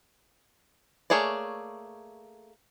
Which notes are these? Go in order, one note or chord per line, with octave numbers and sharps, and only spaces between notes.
A3 A#3 G#4 C#5 D5